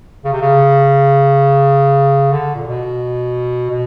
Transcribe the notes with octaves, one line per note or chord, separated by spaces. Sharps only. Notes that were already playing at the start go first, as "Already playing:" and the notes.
C#3
C3
C#3
D3
A#2
B2
B2